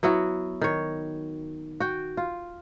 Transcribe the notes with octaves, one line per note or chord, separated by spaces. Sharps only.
F#3 B3 E4 F#4
D#3 C#5
F#4 G5
F4